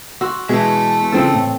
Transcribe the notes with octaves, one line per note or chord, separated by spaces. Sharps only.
F#4 C6 E6
B2 E3 G#3 E5 A5
C#3 F3 C4 A4
A2